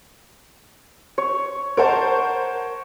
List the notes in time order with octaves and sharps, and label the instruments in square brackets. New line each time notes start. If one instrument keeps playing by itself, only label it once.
[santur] C#5
[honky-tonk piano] A#4 C5 [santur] C#5 F#5 A5